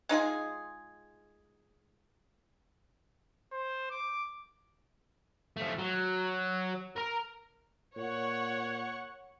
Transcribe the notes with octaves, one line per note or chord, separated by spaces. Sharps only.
G#3 D#4 F4 G#4
C5
D6
F3 A3
F#3
A#4 A#5
A#2 C#5 F#5 C#6